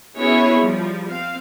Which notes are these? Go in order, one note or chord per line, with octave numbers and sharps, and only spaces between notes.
B3 C#4 E4 F#4 G#4 C#5
F3 G3
C4 F5